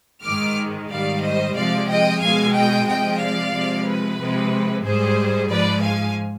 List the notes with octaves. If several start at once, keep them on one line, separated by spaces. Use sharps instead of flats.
G#2 D#3 G#3 D6 F6
G#2 D#3 G3 D5 F5
C5 D#5
C3 F3 G#3 D5 F5
D#5 G5
B2 G#3 F5 G#5
D#5 G5
C3 F3 G#3 D#5 G5
D5 F5
C3 F3 G#3
B4
C3 F3 G#3
G#2 G3 G#4 C5
G#2 F3 G#3 B4 D5
F5 G#5